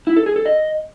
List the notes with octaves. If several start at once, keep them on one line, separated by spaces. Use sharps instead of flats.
E4
A4
G#4
A4
D#5